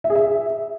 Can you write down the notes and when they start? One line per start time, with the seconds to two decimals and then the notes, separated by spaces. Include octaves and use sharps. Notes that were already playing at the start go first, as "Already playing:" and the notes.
0.04 E5
0.10 G#4
0.15 E5